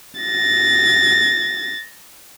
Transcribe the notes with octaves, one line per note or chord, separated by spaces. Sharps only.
A6 A#6